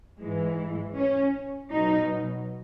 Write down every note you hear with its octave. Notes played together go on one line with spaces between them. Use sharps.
G#2 E3 G#3
C#4
B2 F#3 D#4